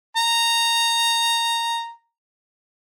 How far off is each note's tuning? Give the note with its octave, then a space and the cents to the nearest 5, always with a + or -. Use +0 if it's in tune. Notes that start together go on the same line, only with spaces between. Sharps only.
A#5 -10